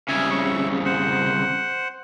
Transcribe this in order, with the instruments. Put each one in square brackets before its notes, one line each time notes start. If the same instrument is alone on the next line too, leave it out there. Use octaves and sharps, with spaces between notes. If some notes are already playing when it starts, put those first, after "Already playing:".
[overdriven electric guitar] C2 C#3 [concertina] E5 G#5
[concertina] C#5 E5
C5 F#5